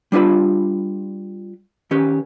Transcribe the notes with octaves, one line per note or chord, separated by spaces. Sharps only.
G3 D4 F4 B4 B5
D#3 C#4 G4 B4